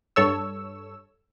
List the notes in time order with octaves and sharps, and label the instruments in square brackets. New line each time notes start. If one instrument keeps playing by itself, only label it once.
[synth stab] G2 A4 C#5 E6